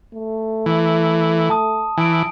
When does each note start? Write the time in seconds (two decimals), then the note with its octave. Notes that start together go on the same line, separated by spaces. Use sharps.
0.14 A3
0.66 E3
1.50 A5 D#6
1.98 E3 G#5 D7